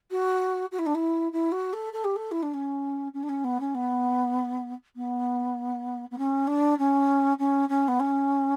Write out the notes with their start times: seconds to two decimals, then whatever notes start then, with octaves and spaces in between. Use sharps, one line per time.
0.11 F#4
0.72 F#4
0.79 E4
0.86 D4
0.95 E4
1.33 E4
1.52 F#4
1.73 A4
1.93 A4
2.04 G4
2.16 A4
2.31 E4
2.43 D4
2.54 C#4
3.14 C#4
3.23 D4
3.29 C#4
3.44 B3
3.60 C#4
3.75 B3
4.96 B3
6.11 B3
6.18 C#4
6.47 D4
6.79 C#4
7.39 C#4
7.69 C#4
7.88 B3
8.00 C#4